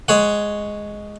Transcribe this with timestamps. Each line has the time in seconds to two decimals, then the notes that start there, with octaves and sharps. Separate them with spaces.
0.08 G#3 C#5 F#5